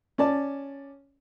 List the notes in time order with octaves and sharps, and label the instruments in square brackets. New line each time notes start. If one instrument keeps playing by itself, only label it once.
[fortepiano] C#4 D5 A5